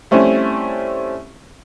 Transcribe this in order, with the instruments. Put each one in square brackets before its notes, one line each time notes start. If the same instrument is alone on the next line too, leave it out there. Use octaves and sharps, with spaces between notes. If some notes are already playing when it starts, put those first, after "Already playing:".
[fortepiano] G3 A3 C4 C#4 E4